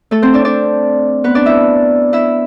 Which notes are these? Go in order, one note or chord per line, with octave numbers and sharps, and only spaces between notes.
A3 A4
C4 C5
D4 D5
D4 D5
B3 B4
D4 D5
E4 E5
E4 E5